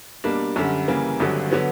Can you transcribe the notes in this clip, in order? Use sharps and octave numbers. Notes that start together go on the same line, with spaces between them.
B2 G3 A#3 D4
F#2 D3 G3
C#3 E3 G3 A#3
G#1 G2 D3 F#3
D3 F#3 B3